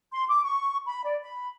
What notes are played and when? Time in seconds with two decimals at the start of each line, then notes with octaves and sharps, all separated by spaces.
0.12 C6
0.28 D6
0.44 C#6
0.86 B5
1.05 D5
1.21 B5